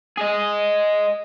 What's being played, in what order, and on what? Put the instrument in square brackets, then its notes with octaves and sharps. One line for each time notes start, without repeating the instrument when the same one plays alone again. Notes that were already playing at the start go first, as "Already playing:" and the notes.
[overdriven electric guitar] G#4 D#5